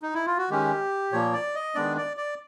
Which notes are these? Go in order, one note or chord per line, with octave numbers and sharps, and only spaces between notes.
D#4
E4
F4
F#4
D#3 G#3 C#4 G4
A#2 F3 A#3 C#5
D5
D#5
D#3 G#3 B3 D4 D5
D5
D5